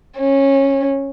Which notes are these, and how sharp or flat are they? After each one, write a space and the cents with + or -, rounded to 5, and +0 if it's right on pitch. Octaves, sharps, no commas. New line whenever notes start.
C#4 -15